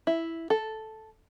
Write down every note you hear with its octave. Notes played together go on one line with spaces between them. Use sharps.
E4
A4